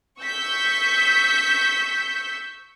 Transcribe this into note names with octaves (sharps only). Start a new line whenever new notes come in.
C#6 E6 G6 B6